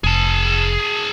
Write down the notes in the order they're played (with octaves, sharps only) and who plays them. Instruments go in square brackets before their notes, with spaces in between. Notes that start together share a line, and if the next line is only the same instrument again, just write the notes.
[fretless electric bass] F1 [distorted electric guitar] G#4 A5